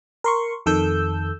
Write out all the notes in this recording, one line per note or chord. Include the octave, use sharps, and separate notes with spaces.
A#4 C6 C#6
F2 D#3 A4 E6 G6